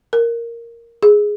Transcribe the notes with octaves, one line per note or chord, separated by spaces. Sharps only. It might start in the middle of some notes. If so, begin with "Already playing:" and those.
A#4
G#4